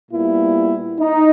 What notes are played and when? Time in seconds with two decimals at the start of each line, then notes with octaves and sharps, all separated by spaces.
0.11 A#2 G3 B3 E4
1.01 D#4